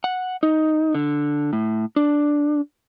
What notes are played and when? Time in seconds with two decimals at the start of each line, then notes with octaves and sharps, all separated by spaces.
0.04 F#5
0.43 D#4
0.95 D3
1.53 A2
1.96 D4